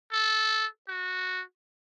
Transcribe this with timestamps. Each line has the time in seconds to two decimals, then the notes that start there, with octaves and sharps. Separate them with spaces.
0.12 A4
0.88 F#4